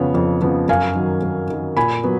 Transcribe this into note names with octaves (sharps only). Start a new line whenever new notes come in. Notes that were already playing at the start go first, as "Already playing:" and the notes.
Already playing: F2 C#3 F3 B3 C#5
F2
C#3 F3 B3
F#2 F5 G#5
D#3 F#3
F#2
D#3 F#3
A#2 G#5 B5
F#3 B3